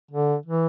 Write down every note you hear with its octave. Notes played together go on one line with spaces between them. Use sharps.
D3
E3